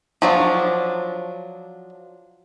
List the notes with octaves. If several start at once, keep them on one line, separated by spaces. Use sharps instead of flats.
F3 F#3 D4